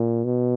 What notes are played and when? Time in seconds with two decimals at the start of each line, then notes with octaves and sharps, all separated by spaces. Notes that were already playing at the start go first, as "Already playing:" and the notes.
Already playing: A#2
0.24 B2